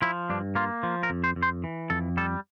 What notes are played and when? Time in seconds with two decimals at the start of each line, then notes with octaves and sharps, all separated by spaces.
0.02 F3 E4
0.30 G2 D4
0.55 A#3 F4
0.83 F3
1.03 A#4
1.10 F2
1.24 C5
1.36 F2
1.43 C5
1.64 E3
1.90 F2 A4
2.17 G3 A4